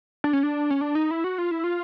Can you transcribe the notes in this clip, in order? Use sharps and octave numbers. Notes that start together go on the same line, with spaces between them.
D4
C#4
D4
C#4
D4
D#4
E4
F#4
F4
E4
F4